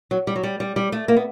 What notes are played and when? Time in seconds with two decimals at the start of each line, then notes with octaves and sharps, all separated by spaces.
0.11 F#3
0.27 G3
0.36 F#3
0.43 G3
0.60 G3
0.76 G3
0.92 A3
1.08 A#3
1.16 B3